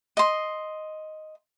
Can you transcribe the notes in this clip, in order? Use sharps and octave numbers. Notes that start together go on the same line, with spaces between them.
D#5 C6